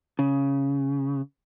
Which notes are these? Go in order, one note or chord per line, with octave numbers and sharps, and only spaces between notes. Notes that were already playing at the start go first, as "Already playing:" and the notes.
C#3